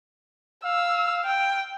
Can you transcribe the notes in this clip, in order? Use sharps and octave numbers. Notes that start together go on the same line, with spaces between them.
F5 E6
G5